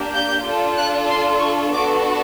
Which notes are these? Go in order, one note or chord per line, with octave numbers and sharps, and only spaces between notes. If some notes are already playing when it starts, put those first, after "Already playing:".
Already playing: A#3 D4 G4
G6
D4 F4 A4
F#6
C6
C#6
B3 D4 F#4 A4 D6